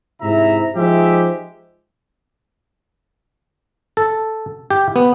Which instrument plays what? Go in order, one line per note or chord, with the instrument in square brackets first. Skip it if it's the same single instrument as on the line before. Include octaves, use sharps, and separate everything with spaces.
[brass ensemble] G#2 C3 E4 E5 A#5
F3 G#3 D#4 G4 E5
[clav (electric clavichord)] A4
G4
B3